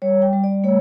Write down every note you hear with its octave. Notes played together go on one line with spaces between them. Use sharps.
G3 C#5
G5
G3
D5
A3 C#5